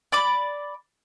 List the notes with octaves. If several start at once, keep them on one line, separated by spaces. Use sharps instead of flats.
D5 B5 D6